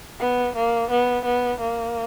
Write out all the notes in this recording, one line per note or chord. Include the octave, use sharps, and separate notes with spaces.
B3
A#3
B3
B3
A#3